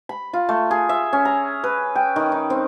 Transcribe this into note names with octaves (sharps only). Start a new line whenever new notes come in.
B5
F4
A3
G#4
E5
C#4
A#5
B4
G5
D#3
D#4
C4